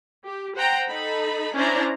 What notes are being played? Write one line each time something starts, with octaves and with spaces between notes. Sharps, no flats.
G4
C5 F#5 G5 A#5
D#4 A4 B5
C#4 D4 E4 C5 D5 A#5